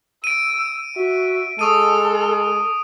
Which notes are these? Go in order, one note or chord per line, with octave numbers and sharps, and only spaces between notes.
E6 D7 D#7
F#4 E5
G#3 A4 C#6 D#6 D#7